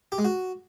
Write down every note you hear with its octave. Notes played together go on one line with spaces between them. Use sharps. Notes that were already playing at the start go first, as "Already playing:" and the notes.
G4
G#3
F#4